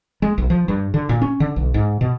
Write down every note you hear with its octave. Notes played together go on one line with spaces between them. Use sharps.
G#3
B1
F3
G2
D3
A#2
C#4
D3
B1
G#2
B2